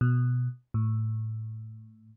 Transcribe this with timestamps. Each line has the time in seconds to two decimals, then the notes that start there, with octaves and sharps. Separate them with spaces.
0.01 B2
0.74 A2